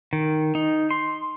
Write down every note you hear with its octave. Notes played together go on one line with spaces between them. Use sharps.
D#3
D#4
C6